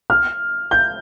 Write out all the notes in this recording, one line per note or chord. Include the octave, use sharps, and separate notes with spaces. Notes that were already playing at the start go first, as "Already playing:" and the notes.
F6
G6